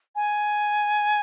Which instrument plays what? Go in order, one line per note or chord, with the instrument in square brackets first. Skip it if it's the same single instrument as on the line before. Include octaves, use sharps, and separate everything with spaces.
[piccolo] G#5